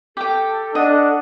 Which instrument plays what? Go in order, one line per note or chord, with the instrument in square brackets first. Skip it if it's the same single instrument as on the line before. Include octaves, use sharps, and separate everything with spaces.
[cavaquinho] G4 G5 [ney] A4
[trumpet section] D4 F#5 [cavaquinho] D#5